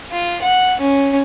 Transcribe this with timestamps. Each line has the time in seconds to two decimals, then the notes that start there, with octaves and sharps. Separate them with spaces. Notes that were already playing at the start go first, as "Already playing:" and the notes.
0.12 F4
0.42 F#5
0.80 C#4